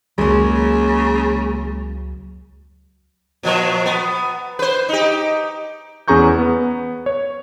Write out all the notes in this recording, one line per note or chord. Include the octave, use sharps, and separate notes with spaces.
C#2 C#3 F#3 G#3 A#3
A#2 F3 F#3
B3
B4 C5
D#4 G4
E2 C#4 G#4 A#5 C#6 G6
B3
C#5